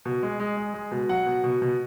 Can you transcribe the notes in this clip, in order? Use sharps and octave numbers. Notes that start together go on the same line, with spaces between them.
B2
G#3
G#3
G#3
G#3
B2
F#3 F#5
B2
B2
B2